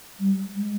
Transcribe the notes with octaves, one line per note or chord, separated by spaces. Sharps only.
G3
G#3